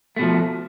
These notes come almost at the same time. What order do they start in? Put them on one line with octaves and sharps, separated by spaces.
A3 B2 F3